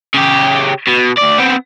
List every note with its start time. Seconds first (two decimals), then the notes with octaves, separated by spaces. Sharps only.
0.14 C#3 G4
0.87 B2
1.17 D2 D5
1.38 B3 C4